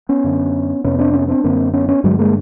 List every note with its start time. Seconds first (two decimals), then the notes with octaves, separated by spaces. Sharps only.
0.09 B3 C#4
0.24 F#2 D3
0.84 F2 C3 B3 C#4
0.99 C4 D4
1.14 B3 C#4
1.28 C4 D4
1.44 F#2 D3 A#3 C4
1.73 B3 C#4
1.89 B3 C#4
2.04 G2 D3 F#3 G#3
2.19 G#3 A#3